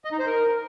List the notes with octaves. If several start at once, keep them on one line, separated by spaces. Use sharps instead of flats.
D#5
D#4
C5
A#4